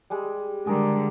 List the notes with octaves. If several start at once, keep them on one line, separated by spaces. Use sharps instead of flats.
G3 G#3
D3 G3 G#3 G#4 A#4